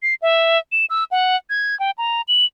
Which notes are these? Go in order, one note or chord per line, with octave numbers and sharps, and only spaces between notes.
C7
E5
E7
E6
F#5
G#6
G5
A#5
F#7